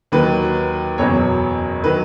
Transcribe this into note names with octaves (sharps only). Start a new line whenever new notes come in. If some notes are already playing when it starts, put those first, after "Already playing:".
D#2 D#3 F#3 B4
F#1 E2 B2 F#3 C#5
D#3 F#3 B4